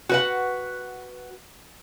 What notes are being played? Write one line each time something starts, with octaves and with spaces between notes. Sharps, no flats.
F#4 B4 F#5